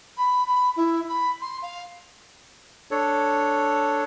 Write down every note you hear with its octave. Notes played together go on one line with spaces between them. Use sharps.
B5
B5
E4
B5
C6
F5
D4 A4 C#5